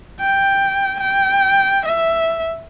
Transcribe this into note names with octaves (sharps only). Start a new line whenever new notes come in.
G5
G5
E5